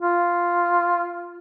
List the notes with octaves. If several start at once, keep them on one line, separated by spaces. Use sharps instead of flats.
F4